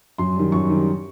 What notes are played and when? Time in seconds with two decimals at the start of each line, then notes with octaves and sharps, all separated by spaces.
0.18 F#2 C6
0.36 D#3 G3
0.52 F#2 C#6
0.70 D#3 G3